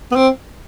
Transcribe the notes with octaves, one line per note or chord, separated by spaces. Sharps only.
B3
C4